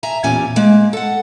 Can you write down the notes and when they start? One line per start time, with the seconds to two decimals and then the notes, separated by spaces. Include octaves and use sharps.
0.03 E5 G#5 A#5
0.23 E2 A#2 C#4 G4 G#5
0.56 G#3 A#3
0.93 A4 F#5